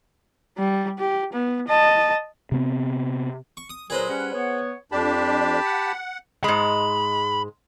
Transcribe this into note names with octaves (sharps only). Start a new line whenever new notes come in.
G3
G4
B3
D#5 A5
C3 B3 C4
C#6
D#6
A#2 F#3 G#3 G#4 B4 C5
G3 C#4 F#5
B3 C#5
F2 D4 G4 A5 B5
F#5
G#2 G#3 B5